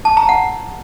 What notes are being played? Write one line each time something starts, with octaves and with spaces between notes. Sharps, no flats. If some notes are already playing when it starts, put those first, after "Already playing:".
A5
A#5
F#5